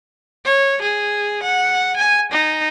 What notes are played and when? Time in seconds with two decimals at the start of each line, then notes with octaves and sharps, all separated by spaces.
0.45 C#5
0.82 G#4
1.43 F#5
1.97 G#5
2.32 D#4